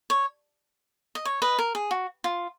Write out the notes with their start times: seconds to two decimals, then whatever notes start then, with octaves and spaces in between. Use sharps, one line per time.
0.10 C#5
1.15 D#5
1.25 C#5
1.42 B4 D#5
1.59 A#4
1.75 G#4
1.91 F#4
2.24 F4